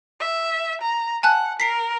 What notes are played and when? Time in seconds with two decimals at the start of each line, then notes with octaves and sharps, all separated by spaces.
0.20 E5
0.82 A#5
1.23 F#5 G#5 A5 F#6
1.60 A#4 B6 C7 D7